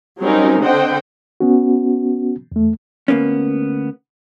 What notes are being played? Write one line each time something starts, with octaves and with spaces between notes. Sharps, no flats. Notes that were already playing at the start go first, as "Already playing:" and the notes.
F#3 G3 C4 C#4 D#4 A#4
D3 C4 C5 D#5 F#5 G5
B3 C#4 F#4
E2 A3
D2 A#3 B3 C#4